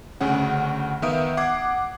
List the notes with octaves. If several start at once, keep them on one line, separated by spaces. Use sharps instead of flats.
D2 C#3 C#4 F#5
D#3 B3 E5 F5 D#6 D7
F#5 D6 G#6 C7